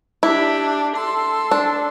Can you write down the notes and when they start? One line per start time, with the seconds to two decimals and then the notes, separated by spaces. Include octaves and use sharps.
0.23 D4 E4 G4
0.96 A4 C6
1.51 D4